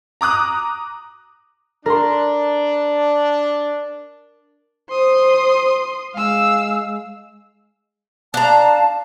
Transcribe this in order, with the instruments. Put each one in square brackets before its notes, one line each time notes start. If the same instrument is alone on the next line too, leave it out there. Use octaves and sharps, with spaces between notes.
[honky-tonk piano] A#5 D6 D#6 F#6
[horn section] D4 [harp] A#4 C6
[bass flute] C5 [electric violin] C6 D#6
[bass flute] G#3 [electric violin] F5 E6
[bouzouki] D4 A#5 [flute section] D5 F5 A5